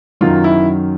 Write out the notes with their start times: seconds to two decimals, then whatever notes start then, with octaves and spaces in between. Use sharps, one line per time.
0.21 F#2 D#3 F#3 F4
0.44 E4